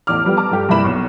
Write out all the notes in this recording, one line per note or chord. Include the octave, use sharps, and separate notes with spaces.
A1 E2 D6 F6
F3 G3 B3 G4
A5 A#5 D6
G2 G4 A4
G2 C3 A#3 E4 B5 E7
B1 C#6